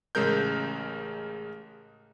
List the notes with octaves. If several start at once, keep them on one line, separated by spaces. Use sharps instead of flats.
A1 C#3 G#3 A#4 G6